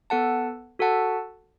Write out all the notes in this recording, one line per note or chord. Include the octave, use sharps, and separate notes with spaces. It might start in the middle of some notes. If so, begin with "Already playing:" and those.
B3 A4 F#5 A5
F#4 A4 F#5 A5